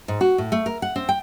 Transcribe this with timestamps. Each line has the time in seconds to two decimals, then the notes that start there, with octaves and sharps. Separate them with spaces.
0.08 G#2
0.21 F#4
0.38 A2
0.52 A3
0.66 A#4
0.82 F#5
0.96 C4
1.09 G5